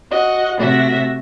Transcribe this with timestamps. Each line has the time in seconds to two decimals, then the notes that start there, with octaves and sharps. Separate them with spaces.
0.10 F#4 D#5 F#5
0.58 C3 A3 F#4 E5 A#6